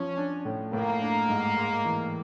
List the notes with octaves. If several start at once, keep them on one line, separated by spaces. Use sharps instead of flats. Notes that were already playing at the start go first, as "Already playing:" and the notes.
Already playing: F3 C#4
D4
A2
A2 A#3
D4
G#2
G#3
E3